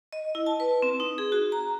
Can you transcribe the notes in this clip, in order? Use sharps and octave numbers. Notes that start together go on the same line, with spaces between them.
D#5
E4
A5
B4
C4
D#4
G#4
F#4
A#5